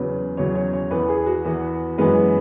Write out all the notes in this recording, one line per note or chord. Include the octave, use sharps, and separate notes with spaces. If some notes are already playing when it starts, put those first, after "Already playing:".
Already playing: E2 C#3 F#3 B4
E2 C#3 F#3 C#5
C#5
C#5
E2 E3 B3 B4
G#4
F#4
E2 E3 B3
F#2 E3 G#3 B3 B4